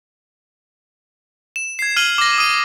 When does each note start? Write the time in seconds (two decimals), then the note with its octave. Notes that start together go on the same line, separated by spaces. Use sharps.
1.56 E7
1.79 G#6 C7
1.97 F6 G#6 D#7 F#7 G7
2.18 D6 A#6
2.38 D#6 D#7